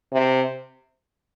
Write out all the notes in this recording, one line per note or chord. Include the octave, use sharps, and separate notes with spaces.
C3